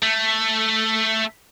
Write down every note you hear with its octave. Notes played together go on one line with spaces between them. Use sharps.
A3